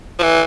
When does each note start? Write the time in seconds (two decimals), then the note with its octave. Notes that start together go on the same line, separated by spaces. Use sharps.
0.19 F3
0.23 E3